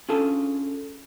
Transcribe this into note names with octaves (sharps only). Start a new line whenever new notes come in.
C#4 D4 F4 G#4 A4 A5